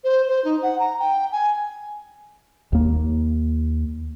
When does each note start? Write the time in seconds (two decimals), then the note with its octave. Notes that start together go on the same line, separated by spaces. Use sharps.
0.04 C5
0.28 C5
0.45 D#4
0.63 F#5
0.79 A#5
1.00 G5
1.32 G#5
2.73 D#2 A#3